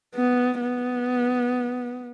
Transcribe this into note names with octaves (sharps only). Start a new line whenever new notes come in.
B3
B3